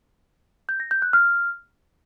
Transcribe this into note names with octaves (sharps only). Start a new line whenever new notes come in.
G6
A#6
G6
F#6
F6